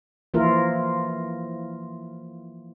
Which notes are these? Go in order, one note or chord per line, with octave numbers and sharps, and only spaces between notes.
E3 F3 A#3 E4 F4 A#4